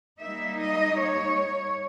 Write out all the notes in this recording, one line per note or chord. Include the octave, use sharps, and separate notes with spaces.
G3 A#3 D#4 E5
D#5
C#5